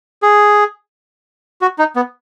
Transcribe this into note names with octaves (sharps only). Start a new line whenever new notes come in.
G#4
F#4
D#4
B3